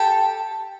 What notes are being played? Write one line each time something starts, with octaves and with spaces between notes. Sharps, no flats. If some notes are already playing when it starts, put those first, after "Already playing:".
Already playing: G4 A4